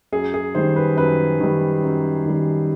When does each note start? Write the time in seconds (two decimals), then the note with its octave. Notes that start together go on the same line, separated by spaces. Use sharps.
0.12 F#2 G#4
0.34 G#4
0.55 D#3 G3 C5
0.76 B4
0.97 F#2 B4
1.40 D#3 G3
1.83 F#2
2.26 D#3 G3